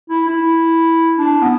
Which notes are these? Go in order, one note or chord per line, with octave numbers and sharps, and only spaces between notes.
E4
E4
D4
B3